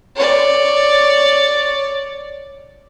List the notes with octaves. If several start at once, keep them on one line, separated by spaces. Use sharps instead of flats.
C#5 D5